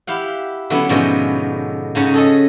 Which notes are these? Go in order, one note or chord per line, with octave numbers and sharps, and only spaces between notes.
E4 G4 F5 F#5
D3 F#3 B3 C#4 E4
G#2 B2 D3 F3 G#3 C#4
G#2 C#3 C#4 C#5 F#5 A#5
G#4 A4 C#5 D#5